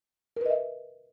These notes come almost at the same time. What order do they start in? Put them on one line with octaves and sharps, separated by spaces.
A#4 B4 D#5 E5